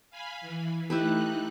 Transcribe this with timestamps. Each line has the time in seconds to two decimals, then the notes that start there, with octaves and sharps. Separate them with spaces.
0.10 F5 G#5 B5
0.41 E3
0.90 A3 D#4 E4 G4 B4 F#6